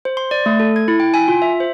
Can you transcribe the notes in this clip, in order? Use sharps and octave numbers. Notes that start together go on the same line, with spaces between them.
C5
C6
D5
A3
A4
G#6
E4
G5
G#5
F4
E5
C5